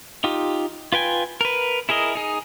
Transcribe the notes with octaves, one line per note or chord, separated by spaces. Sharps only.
D#4 F4 G4
F4 B4 G5 G#5
A#4 B4
E4 G#4 A#4 D#5
D#4 G#4